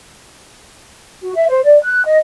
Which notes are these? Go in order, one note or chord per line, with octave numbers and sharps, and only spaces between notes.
F#4
E5
C5
D5
F#6
D#5